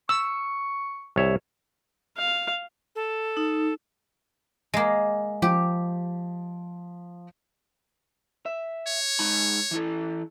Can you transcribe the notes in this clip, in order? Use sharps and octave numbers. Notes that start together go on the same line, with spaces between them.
C#6 E6
C2 C#5 E5
F5
A4
D#4
G#3 A#3
F3 G4
E5
C#5
G#3 D#4 B5
E3 E4 A4